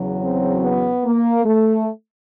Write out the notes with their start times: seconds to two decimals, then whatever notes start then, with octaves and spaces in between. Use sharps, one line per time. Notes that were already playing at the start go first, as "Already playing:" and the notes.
Already playing: E2 C#3 F#3
0.21 C4
0.62 B3
1.05 A#3
1.46 A3